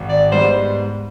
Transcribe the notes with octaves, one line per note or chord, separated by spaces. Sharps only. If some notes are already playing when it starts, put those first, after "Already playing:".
Already playing: G#1
D5
G#2 G3 B3 C5